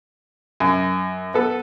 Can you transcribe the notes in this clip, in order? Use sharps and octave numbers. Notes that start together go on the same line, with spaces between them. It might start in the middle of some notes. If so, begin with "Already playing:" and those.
F#2
B3 A4